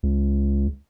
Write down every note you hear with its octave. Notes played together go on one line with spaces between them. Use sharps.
C#2